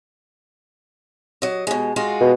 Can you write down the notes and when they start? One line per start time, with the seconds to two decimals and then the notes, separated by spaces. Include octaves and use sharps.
1.42 F#3 D#5
1.67 B2 G#3
1.96 G#3 F4 F#4
2.21 B2